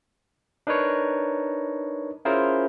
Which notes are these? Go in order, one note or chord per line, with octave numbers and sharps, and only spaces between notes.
D4 D#4 A#4 B4 C#5
C#4 E4 F4 G#4 A#4 C5